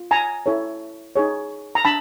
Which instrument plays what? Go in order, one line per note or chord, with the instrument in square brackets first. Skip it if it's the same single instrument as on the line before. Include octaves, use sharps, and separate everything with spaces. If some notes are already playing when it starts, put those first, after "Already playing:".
Already playing: [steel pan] F4
G#5 A#5
E4 A4 C#5
D#4 G#4 C#5
A#5
D4 A5 B5